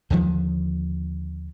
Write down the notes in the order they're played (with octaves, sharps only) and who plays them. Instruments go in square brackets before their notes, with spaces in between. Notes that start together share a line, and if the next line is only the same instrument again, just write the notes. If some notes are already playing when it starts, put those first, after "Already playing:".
[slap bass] D#2 D3 D#3 F3